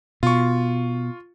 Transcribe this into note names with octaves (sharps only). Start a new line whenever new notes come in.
B2 F4 C#6